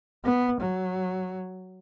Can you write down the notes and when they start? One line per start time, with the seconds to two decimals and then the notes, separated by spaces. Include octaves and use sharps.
0.25 B3
0.61 F#3